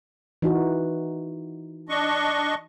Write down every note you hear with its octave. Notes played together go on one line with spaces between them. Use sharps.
E3 D#4 F#4
D4 D#5 C#6